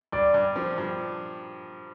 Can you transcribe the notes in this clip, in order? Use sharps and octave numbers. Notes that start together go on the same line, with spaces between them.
G2 D5
G2
F3
G2